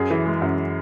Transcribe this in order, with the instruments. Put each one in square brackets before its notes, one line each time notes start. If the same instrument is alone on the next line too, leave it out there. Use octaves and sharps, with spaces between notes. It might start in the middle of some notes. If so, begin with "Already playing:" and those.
Already playing: [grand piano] F#2 G#4
E3
G#3
F#2